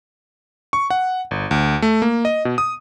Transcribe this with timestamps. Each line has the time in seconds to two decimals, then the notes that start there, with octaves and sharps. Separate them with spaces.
0.73 C#6
0.90 F#5
1.31 G1
1.51 D2
1.82 A3
2.02 A#3
2.25 D#5
2.45 B2
2.58 D#6